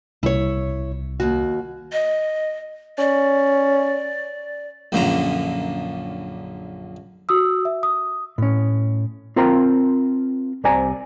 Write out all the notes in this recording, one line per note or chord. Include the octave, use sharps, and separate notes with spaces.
C2 E4 C#5
D#2 F#4
D#5
C#4 D5
A#1 F#2 A#2 D3 A#5
F#4 D#6 E6
E5
D#6
A2 C#4
C4 F4 A#4 C5 G5 A#5
C2 C3 C5 D5 G#5 A#5